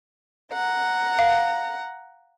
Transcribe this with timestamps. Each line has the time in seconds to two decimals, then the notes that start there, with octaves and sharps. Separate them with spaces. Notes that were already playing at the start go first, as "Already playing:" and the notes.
0.52 F#5 A#5
1.19 F5